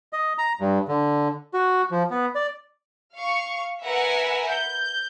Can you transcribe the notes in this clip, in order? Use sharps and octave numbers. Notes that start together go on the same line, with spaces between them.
D#5
A#5
G2
D3
F#4
F3
B3
D5
F5 C#6
A#4 B4 E5 F#5 G#5
G6